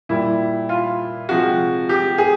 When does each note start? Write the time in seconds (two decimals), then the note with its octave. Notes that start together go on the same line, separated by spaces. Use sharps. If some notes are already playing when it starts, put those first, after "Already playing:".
0.09 A#2 G3 E4
0.69 F4
1.29 C3 F3 G#3 F#4
1.89 G4
2.18 G#4